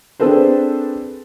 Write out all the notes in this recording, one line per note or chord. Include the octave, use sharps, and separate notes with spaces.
C4 D4 G#4 A4 B4 C5